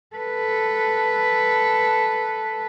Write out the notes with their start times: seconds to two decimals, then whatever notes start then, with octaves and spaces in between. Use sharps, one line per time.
0.16 A4 B4